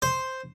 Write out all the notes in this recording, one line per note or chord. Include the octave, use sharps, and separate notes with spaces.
C5